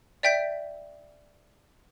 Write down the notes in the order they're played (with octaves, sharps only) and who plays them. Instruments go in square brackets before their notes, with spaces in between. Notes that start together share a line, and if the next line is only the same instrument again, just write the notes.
[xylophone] D5 E5 G5 G6 B6